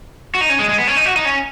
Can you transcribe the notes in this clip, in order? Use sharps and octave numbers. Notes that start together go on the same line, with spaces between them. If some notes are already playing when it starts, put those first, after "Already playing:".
F#4
D#4
C#4
G#3
G#3
B3
C#4
D#4
F#4
D#4
C#4